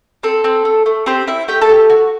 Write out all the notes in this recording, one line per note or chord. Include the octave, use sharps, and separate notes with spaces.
C4 A4
C4
A3
A3
C4 G4 C5
C4 E4 E5
A3 G4 G5
A4 A5
G4
F#4